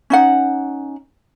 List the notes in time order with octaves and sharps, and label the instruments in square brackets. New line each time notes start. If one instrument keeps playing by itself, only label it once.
[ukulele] C#4 D#4 F#5